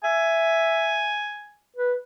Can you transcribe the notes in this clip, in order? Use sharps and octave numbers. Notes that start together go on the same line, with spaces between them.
E5 G#5
B4